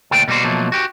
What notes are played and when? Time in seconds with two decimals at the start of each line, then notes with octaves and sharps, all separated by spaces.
0.11 D2 A#2 A3 D4 G5
0.28 B2 G3 A#3 F#4 C5
0.44 B2 F3 F#3 A3 A#3
0.72 F#4 G4